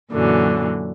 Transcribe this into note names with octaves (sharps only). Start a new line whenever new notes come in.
F#2 A#2 D3 E3 F#3